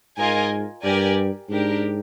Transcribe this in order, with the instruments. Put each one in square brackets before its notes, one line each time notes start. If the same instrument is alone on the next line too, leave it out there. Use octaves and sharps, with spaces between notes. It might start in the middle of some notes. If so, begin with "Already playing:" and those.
[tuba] G#2 [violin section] F4 A#4 D#5 G#5
[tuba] G2 [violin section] G4 A#4 D5 G#5
[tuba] G#2 [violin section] D4 G4 A#4